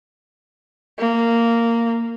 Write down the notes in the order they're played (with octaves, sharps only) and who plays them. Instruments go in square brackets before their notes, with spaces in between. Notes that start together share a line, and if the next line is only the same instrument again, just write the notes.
[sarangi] A#3